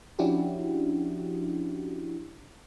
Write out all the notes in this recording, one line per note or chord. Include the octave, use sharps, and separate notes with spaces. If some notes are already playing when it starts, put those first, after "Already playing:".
F3 C#4 D4 E4 F#4 G4